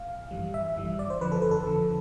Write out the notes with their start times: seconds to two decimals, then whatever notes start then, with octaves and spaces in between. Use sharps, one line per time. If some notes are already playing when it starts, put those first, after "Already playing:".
Already playing: F5
0.09 A1
0.31 G2 E3 G3
0.54 A1 E5
0.76 G2 E3 G3
0.99 G1 D5
1.10 C5
1.21 F2 D3 F3 B4
1.32 A4
1.42 G1 B4
1.51 A4
1.66 F2 D3 F3